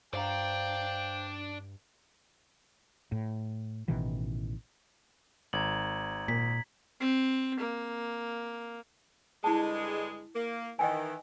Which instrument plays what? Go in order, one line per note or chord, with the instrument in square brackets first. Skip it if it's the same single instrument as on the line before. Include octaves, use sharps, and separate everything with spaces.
[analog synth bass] G2 [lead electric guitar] D4 D5 [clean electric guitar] C5 F5 A#5 [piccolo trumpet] G5
[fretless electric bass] A2
A1 B2 D#3 E3
[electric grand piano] G#1 [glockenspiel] A#5 G#6 F#7
[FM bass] A#2 [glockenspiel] B6
[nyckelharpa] C4
A#3
[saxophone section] G2 D3 G#3 [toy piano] E4 A5
[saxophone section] A#3
[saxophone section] D#3 E3 [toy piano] D#5 G5 G#5